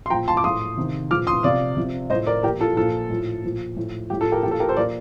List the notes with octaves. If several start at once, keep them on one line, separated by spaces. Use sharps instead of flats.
C6
A#2 F3 G5 A#5
A5 C6
D6
A2 F3 C6 D#6
C3 D#3
A#2 F3 D6 F6
C6 D#6
C3 F3 D5 F5
C3 F3
A2 F3 C5 D#5
A#4 D5
A#2 F3 G4 A#4
F4 A4
A#2 F3 F4 A4
A2 F3
A#2 F3
A2 F3
A2 F3 G4
F4 A4
G4 A#4
A#2 F3 G4
F4 A4
G4 A#4
A4 C5
A#2 F3 A#4 D5